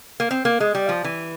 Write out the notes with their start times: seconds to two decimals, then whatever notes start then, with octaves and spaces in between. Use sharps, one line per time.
0.20 A#3
0.31 C4
0.45 A#3
0.60 G#3
0.75 G3
0.89 F3
1.04 E3